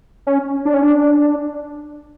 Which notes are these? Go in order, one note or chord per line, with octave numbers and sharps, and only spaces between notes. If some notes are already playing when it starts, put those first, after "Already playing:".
C#4
D4
C#4
D4